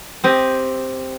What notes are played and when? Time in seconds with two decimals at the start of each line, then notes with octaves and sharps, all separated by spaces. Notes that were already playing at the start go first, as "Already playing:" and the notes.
0.24 C4 G4 D#5